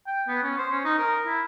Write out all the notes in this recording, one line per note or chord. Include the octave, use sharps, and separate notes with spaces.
G5
B3
C#4
C5
C#4
D#4
A#4
E4